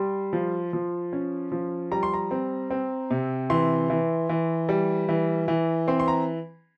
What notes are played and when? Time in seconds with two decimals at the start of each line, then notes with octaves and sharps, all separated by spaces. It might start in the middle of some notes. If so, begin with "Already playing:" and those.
Already playing: G3 C6
0.33 F3
0.73 F3
1.13 C#4
1.52 F3
1.91 G3 A#5
2.03 C6
2.14 A#5
2.31 C4
2.70 C4
3.11 C3
3.50 E3 C6
3.90 E3
4.29 E3
4.69 G3
5.09 E3
5.48 E3
5.88 C4 C6
6.00 C6
6.08 A#5